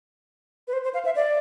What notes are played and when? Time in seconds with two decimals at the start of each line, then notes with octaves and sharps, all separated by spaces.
0.68 B4
0.73 C5
0.84 C5
0.94 F5
1.05 E5
1.16 D5